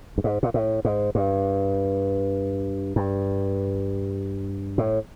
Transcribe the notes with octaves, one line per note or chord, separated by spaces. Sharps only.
G2
G#2
A#2
A2
G#2
G2
G2
A2